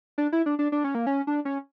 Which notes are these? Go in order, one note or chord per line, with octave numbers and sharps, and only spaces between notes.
D4
E4
D4
D4
D4
C#4
A#3
C#4
D4
C#4